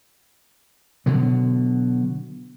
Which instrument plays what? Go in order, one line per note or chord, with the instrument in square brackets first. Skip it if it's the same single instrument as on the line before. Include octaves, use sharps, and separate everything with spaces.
[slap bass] B2 D3 F#3